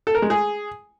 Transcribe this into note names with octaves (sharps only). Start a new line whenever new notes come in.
A4
A#4
G#3
G#4